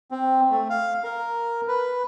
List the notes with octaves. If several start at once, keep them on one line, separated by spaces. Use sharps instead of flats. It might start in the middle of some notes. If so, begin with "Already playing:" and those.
C4
A3
F5
A#4
B4